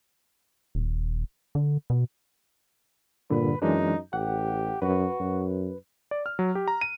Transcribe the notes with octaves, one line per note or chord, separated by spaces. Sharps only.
D#1
D3
B2
G2 A#2 D3 B4
F#2 E3 G#3 D4 D#4
A1 G4 F#5
F#2 F#4 B4
F#2
D5
F6
F#3
G4
A#5
D#7